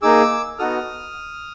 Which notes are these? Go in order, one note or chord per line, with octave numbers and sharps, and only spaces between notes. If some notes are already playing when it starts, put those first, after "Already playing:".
A#3 D#4 G#4 D6 E6
B3 D#4 F#4 A4 D#6 F6